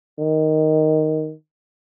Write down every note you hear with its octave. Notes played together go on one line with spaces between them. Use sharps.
D#3